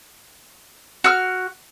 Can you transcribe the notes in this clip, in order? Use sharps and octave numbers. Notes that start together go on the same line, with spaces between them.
F#4 E6 F6